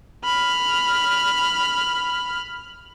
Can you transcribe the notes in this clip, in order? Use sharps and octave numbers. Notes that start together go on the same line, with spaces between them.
B5 F6